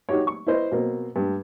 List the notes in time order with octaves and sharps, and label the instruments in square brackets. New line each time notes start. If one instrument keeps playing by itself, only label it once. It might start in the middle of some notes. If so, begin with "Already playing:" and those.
[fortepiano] D#4 F#4 G4 C#5
C#6
E4 B4 C5 D#5
B2 A#3 C4
G2